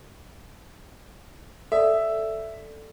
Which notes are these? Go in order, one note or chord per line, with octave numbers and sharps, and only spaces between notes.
A4 D5 E5